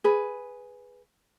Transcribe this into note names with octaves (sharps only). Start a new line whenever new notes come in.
G#4 B4